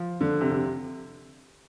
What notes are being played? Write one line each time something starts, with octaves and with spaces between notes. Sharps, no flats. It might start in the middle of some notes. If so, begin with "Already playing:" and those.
Already playing: F3
D3
C3
C3